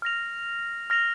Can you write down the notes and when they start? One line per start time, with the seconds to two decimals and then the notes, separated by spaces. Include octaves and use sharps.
0.02 F6 A#6 F7
0.90 F6 A#6 F7